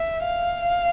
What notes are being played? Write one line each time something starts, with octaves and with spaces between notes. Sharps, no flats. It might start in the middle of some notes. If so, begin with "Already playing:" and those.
Already playing: E5
F5